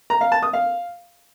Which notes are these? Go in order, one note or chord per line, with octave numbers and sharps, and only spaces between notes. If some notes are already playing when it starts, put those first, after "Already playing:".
A#5
F5
A5
D#6
F5